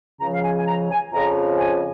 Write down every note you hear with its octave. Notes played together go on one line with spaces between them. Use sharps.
C#2 C#3 F3 A#5
F5
G#5
G#5
A#5
G#5
F2 C#3 F3 A#5
G#5